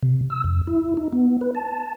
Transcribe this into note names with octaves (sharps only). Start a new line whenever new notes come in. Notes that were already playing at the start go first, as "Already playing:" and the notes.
C3
E6
F2
E4
D#4
B3
B4
A5